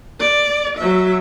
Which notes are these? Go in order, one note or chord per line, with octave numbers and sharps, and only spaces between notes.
D5
F#3 E5